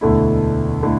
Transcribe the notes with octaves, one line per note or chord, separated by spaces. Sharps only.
E1 D2 D3 A3 E4
D3 A3 E4